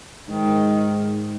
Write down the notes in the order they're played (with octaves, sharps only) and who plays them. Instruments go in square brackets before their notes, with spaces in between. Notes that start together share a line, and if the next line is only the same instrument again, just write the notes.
[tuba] G#2 [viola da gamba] D#3